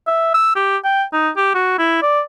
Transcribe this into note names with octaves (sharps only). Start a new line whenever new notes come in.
E5
E6
G4
G5
D#4
G4
F#4
E4
D5